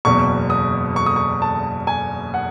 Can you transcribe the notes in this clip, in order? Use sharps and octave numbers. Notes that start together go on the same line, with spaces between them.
F#1 E2 B2 C#6
D#6
C#6
D#6
C#6
A5
G#5
F#5